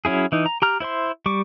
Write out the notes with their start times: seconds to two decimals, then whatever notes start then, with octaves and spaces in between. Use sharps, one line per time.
0.05 F#3 C#4 E4 G#4
0.32 E3 D#4
0.46 A#5
0.62 G4 A#5 F6
0.80 E4 C5 E5 C6
1.26 G3 C#6 D6